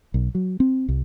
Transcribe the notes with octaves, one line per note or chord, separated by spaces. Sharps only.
B1
F#3
C4
C2